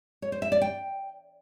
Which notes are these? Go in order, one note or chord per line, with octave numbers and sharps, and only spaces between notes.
C#5
C5
E5
D5
G5